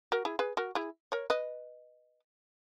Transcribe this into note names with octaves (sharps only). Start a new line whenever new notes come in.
F#4 A#4
E4 G#4
G#4 B4
F#4 A#4
E4 G#4
A#4 C#5
B4 D#5